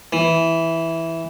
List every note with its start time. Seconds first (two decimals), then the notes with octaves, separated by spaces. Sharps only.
0.13 E3